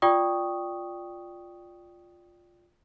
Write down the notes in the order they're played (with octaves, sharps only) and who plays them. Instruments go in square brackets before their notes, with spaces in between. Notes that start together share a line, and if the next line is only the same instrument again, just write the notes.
[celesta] F4 D5 G5 C#6 D#6